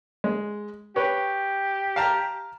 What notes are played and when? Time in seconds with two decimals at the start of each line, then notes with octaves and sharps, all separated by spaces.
0.24 G#3
0.96 G4 B4 C#5
1.96 F5 A5 A#5